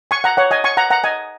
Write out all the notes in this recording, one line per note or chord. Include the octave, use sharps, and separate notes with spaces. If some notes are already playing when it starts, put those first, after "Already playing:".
G#5 C#6
F#5 A#5
C#5 F#5
D#5 G#5
G#5 C#6
F#5 A#5
F#5 A#5
D#5 G#5